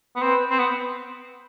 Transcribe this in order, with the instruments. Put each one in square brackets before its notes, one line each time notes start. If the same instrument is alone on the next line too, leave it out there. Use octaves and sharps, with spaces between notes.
[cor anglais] B3
[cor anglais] C4 [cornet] B4
[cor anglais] C4
B3